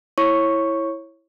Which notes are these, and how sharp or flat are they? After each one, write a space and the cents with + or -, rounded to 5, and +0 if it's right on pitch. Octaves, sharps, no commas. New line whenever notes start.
E4 +0 C#5 -20 C#6 +0